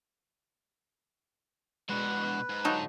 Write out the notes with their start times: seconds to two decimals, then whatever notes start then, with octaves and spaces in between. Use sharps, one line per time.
1.89 B2 G#3 D4 F#4 B4
2.49 G#2
2.65 D3 F#3 D#4 F4 A5